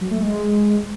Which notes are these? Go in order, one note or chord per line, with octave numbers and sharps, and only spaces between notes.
F#3
A3
G#3